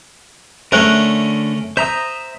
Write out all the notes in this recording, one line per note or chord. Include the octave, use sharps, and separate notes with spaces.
D3 A3 C#4 A#4 E5 F#6
C5 E5 A#5 D#6